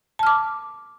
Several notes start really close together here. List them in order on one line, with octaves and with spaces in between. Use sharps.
A5 F6 D6